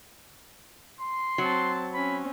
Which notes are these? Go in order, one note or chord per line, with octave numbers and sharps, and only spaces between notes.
C6
F#3 C4 A5
C4 C#4 B5